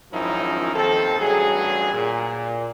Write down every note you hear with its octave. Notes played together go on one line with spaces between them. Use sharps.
G#1 F#2 F3 C#4 D#4 E4
D#2 D#3 C4 A4
A1 G2 F#3 G#4
A#2